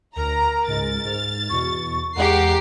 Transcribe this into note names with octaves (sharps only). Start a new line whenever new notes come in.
D2 A#4 A#5
C#2 G#2 G#3 A6
G#2 F6
E2 B2 C#6
E2 G#3 G4 G#4 A#4 F#5 C7